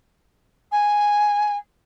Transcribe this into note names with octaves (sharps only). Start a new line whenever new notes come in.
G#5